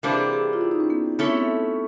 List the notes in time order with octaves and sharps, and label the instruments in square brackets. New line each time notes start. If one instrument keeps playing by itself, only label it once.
[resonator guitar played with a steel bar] C3 E3 G3 A#3 D4 [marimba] C5
[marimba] G#4
G4
G#4
F4
E4
D#4
C#4
B3
[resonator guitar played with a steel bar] A3 C#4 E4 A4 C#5 [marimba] B3
[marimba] C4
B3